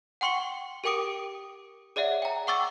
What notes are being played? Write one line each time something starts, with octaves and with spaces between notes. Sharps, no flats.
F#5 G5 C6 C#6 C#7 G7
G4 A#4 G5 D6 D#6 D7
G#4 C#5 D5 E5 F#5
G5 A#5
F#5 G5 C#6 D6 E6 A6